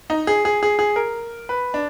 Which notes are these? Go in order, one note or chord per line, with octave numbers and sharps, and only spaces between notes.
D#4
G#4
G#4
G#4
G#4
A#4
B4
D4